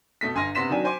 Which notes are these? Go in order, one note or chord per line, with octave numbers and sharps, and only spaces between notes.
B2 A3 B6
G1 G#5 C6 F6 A#6
C3 B3 C6 B6 E7
D#3 F#3 D4 G#5
C5 G#5 C6 D6